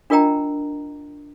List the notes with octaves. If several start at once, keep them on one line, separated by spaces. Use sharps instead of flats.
D4 F4 A#4 D#5 G5 A#5